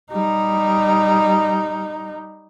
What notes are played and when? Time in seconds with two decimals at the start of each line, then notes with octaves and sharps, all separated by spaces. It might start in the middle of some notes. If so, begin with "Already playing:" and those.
0.12 G3 D#4